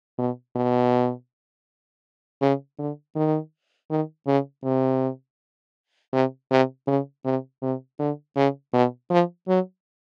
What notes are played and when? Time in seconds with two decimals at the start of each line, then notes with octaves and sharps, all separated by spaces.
0.19 B2
0.56 B2
2.42 C#3
2.79 D3
3.16 D#3
3.90 D#3
4.27 C#3
4.64 C3
6.13 C3
6.51 C3
6.87 C#3
7.25 C3
7.62 C3
7.99 D3
8.36 C#3
8.73 B2
9.10 F3
9.48 F#3